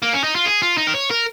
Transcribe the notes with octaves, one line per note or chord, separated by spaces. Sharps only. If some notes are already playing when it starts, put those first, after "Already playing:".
A#3
C#4
D#4
F4
G#4
F4
D#4
A#4
C#5
A#4